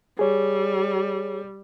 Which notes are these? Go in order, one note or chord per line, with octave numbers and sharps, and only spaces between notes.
G3 G#4 C#5